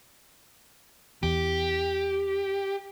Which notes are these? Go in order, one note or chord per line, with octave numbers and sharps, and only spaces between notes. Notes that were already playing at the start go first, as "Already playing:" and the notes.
E2 G4